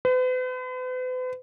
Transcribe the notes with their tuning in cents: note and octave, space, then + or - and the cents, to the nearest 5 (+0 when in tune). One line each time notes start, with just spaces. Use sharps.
B4 +45